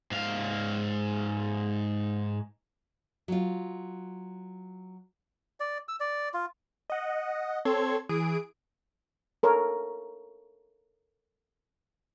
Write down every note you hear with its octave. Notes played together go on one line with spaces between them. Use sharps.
G#2 F5
F#3 F4
D5
E6
D5
F4
D#5 F#5
C4 A4 C#5 C6 G#6
E3 G#4 D#6 D7
A4 A#4 C#5